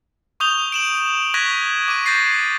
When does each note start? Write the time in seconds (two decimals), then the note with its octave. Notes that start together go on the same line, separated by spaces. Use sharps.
0.40 C#6 D#6 G6 F7 G7
0.72 D7 E7 F#7
1.34 C#6 F#6 G#6 A#6 B6 E7
1.88 D6 D#7
2.06 G6 A6 A#6 C7